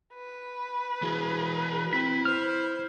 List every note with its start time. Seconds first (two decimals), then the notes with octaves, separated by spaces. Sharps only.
0.14 B4
1.02 E3 E4 F#4 G#4
1.93 C4 E4 B6
2.25 C5 F6